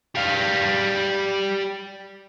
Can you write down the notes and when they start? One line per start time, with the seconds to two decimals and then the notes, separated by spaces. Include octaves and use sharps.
0.15 G3 F5